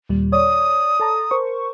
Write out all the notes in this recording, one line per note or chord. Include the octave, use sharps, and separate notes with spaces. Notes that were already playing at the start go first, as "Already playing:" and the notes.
D#2 A#2 G3
C#5 D5 D#6
A4 A5 A#5
A#4 C5 C#6